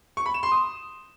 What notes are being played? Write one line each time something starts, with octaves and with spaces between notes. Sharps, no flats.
C#6
B5
E7
C6
D#6